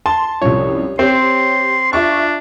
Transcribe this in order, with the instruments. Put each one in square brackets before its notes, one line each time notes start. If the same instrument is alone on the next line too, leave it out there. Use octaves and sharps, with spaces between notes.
[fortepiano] A5 [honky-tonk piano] C6
[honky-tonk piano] C2 F#2 F3 [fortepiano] C#5
[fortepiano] C4 [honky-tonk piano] G4 C#5 [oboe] C6
[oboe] D4 [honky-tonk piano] F4 E5 C#6